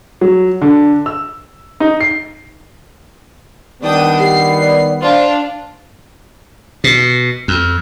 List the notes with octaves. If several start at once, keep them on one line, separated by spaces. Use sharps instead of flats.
F#3
D3
E6
D#4
C7
D#3 G3 B3 D4 G5 D#6
G4 C7
D5
D4 F4 C5
B2
F2